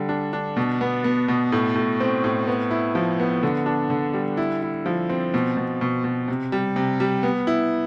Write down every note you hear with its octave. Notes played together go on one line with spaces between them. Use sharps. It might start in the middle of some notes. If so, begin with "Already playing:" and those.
Already playing: D3 G3
D4
D4
B2
B3
B3
B2
A2
A2
C4
A2
B3
E4
F3
B3
D3
D4
D3
G3
E4
E4
F3
C4
B2
B2
B2
B2
C3
G3
C3
G3
B3
E4